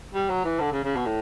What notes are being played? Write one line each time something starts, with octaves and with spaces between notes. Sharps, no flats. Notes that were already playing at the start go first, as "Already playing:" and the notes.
G3
F#3
E3
D3
C#3
C#3
B2
A2